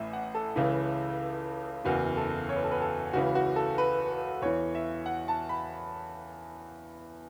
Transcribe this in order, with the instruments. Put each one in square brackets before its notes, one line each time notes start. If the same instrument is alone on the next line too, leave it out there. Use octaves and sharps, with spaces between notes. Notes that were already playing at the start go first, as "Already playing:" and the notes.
Already playing: [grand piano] A1 A2 E3 E5
F#5
A4
C#2 C#3 E3
F#1 E2 E3 F#4
A4
C#5
B4
A4
B4
A4
C#2 C#3 E3 F#4
F#4
A4
B4
E2 E3 C#5
E5
F#5
A5
B5